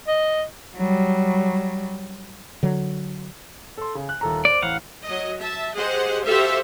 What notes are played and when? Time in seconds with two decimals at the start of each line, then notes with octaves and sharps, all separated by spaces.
0.08 D#5
0.76 F#3 G3
2.63 D3 F#3
3.78 A4 C6
3.95 C#3
4.09 F#6
4.21 D#1 A4 A#5
4.45 C5 D5 D6
4.62 A1 F5 F#5
5.05 F#3 D#5
5.39 E5 A5
5.74 G4 G#4 C5 D#5 F#5
6.24 F#4 G4 A4 C5 E5 F5